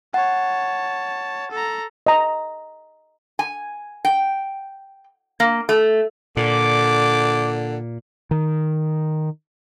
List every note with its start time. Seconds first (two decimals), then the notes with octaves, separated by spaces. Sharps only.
0.14 C#5 F#5 A5
1.51 A4 A#5
2.07 D#5 A#5
3.39 G#5
4.05 G5
5.40 A#3
5.69 A3
6.37 A#2 D3 D6
8.31 D#3